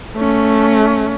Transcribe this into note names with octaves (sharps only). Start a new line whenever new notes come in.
A3 C#4